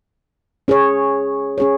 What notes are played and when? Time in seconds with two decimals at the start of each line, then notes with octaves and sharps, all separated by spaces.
0.68 C#4 G#4 C#5
1.58 C#4 G#4 C#5